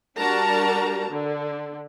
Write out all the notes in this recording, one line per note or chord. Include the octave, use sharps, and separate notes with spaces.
G3 D4 F#4 A#4 A5 A#5
D3